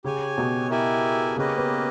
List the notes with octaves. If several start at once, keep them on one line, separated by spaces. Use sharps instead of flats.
C#3 G4 C#5 G#5
B2
E4 G4 A#4 E5 G#5
C#3 A#3 C#4 G4 B4 D#5
B3